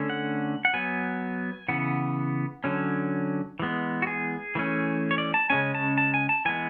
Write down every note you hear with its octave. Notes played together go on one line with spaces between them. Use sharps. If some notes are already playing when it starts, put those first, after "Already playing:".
Already playing: D3 A3 C#4
F#5
F#5
F#3 B3 G#5
C#3 E3 B3 F#5
D3 F#3 C#4
E3 G#3 B3
F#4
G#4
E3 A3 C#4
C#5
D5
A5
C#3 G#3 C#4 G#5
A5
A5
G#5
A5
E3 G#3 B3 G#5